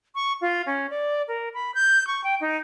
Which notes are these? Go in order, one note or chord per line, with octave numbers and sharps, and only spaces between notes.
C#6
F4
C#4
D5
A#4
B5
G6
C#6
G5
D#4